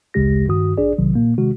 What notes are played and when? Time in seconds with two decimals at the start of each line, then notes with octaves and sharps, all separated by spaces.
0.14 A1 D2 C#3 G#3 G4 A#6
0.48 G2 D#3 F#4 D#6
0.78 A1 D4 G#4 D5
0.98 B1 C3 D#3 F#3
1.15 A#2 A#3
1.38 C3 D#3 G#3 F#4